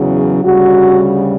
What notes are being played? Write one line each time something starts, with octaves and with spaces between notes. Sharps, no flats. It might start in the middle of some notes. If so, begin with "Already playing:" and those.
Already playing: E2 C#3 F#3
D2 C#3 G3 F#4